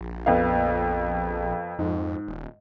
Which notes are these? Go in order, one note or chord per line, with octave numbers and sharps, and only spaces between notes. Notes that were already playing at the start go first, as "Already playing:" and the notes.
A#1
F2 B3 F5
F2 G#2
D#1